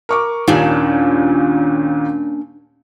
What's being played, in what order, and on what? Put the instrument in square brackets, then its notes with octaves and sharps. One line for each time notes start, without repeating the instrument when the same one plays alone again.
[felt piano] A#4 C#6 D6
[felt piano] D#2 A#2 D#3 [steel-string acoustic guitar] A#3 C#4 D4